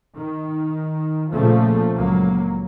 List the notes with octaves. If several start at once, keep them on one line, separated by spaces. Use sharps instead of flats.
D#3
A#2 C#3 F3 A3
C#2 F#3 A#3